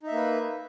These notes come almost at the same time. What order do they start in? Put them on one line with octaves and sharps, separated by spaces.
D#4 E5 A#3 B4